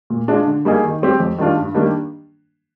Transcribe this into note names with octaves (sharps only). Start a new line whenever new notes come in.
A#2
G#3 D4 F4
D3
G3 A#3 D#4 G#4
D#3
G3 C4 G4
F2
D#3 G3 D4 F4
G2
D#3 G3 A#3 D4